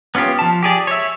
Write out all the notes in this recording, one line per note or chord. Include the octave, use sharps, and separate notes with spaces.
B3 C#4 F4 G4
F3 A5
G4 G#4 D5
C#5 E5